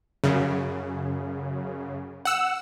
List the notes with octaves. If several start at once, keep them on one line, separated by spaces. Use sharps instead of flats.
F#2 C#3
F#5 E6